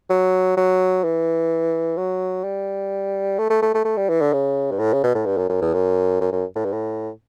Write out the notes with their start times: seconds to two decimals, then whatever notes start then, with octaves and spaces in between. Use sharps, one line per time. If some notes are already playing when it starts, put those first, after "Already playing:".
0.10 F#3
0.57 F#3
1.04 E3
1.98 F#3
2.44 G3
3.39 A3
3.50 A3
3.62 A3
3.74 A3
3.85 A3
3.97 G3
4.09 E3
4.21 D3
4.33 C#3
4.71 G2
4.79 A2
4.93 C#3
5.04 B2
5.15 A2
5.26 G2
5.38 F#2
5.50 F#2
5.61 E2
5.74 F#2
6.21 F#2
6.32 F#2
6.56 A2
6.65 G2
6.73 A2